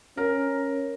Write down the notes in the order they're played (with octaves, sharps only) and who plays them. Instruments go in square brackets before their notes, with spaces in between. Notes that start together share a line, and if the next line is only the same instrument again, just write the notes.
[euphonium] C#4 [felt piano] A#4